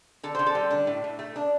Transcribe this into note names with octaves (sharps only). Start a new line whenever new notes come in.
D3 A4
D3 C5
A4
G3
D4
A2
A2
A3
D4